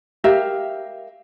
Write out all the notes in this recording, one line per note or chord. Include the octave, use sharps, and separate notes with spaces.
G4 A#4 E5 F5